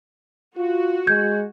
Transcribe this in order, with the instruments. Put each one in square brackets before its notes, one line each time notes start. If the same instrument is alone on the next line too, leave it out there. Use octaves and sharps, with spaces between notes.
[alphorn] F4 [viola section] F#4
[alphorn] G#3 [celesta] G6 G#6